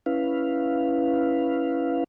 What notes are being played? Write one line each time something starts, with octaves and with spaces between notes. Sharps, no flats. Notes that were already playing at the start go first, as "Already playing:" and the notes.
C#4 E4 B4 F5